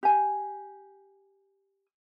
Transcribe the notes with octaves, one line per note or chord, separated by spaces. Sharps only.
G4 G#5